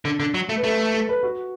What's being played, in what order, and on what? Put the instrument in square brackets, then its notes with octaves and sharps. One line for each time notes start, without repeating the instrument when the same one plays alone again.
[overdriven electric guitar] D3
D3
F#3
A3
[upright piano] B4
[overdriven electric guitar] A3 [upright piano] A4
[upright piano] A4
B4
F#4